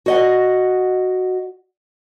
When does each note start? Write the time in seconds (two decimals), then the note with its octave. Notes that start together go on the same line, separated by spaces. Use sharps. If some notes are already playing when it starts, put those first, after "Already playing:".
0.06 F#4 D#5 F#5